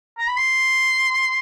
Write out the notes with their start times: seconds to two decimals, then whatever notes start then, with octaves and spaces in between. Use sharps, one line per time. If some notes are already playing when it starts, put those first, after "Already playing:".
0.18 A#5
0.28 B5
0.37 C6